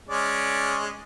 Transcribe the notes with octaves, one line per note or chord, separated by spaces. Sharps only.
G#3 C#4 D5